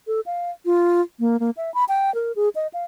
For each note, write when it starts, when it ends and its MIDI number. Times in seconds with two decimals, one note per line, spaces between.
0.07 0.20 69
0.26 0.50 77
0.65 1.01 65
1.20 1.39 58
1.40 1.50 58
1.57 1.73 76
1.74 1.84 83
1.89 2.13 79
2.15 2.32 70
2.36 2.49 68
2.55 2.67 75
2.74 2.84 77